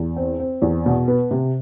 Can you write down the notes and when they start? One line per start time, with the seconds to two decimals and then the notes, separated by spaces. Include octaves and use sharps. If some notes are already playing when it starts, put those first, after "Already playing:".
Already playing: E2
0.16 C4
0.40 C4
0.62 E2
0.86 B2
1.08 B3
1.31 C3